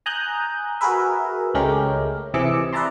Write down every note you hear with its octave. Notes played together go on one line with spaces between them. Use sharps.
G#5 A#5 D#6 F#6 G6
F#4 G#4 A#4 B4 E5
C#2 G#3 A3 C#4 G4 A#4
C3 E3 G#4 D6 E6 C#7
B4 D5 E5 A5 A#5 C6